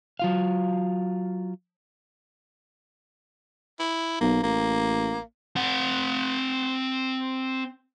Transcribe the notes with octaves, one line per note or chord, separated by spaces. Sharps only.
F#3 F4 F5
E4
B1 A#3
A1 A#3
C4 F#5